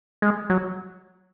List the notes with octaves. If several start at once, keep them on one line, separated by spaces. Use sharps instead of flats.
G#3
F#3